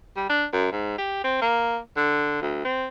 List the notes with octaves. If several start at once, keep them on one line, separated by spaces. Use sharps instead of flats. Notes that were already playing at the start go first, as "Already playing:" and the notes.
G3
D4
F#2
G#2
G4
C4
A#3
D3
D2
C4